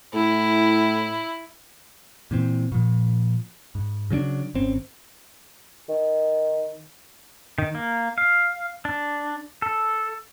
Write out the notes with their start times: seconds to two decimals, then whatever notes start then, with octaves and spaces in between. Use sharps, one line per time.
0.14 A2 E4
2.31 A#2 E3 C4
2.72 A#2 F3
3.75 G#2
4.10 C#3 F#3 C#4 D4
4.55 G#1 C4 C#4
5.89 D#3
7.58 D#3
7.75 A#3
8.18 F5
8.85 D4
9.62 A4